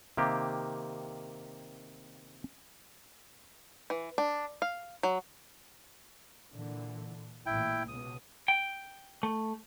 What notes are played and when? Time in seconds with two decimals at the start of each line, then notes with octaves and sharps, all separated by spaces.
0.17 C3 D#3 A#3 G4
3.90 E3
4.18 D4
4.62 F5
5.03 F#3
6.53 A#2 D3 E3
7.46 A1 A#2 E4 G5
7.88 C#2 B2 D#6
8.48 G5
9.23 A3